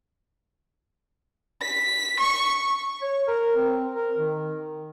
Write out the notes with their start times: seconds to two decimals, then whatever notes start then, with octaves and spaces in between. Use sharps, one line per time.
1.61 B6
2.20 C#6
3.02 C#5
3.28 A#4
3.56 C4
3.95 A#4
4.18 D#3